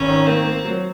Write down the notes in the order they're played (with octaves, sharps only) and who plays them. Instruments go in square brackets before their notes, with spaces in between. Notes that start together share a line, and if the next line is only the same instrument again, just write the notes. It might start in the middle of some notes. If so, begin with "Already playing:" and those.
Already playing: [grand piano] G#1 [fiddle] C#4
[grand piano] D#3
[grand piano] A#3 [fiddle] C4
[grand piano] A#3
F#3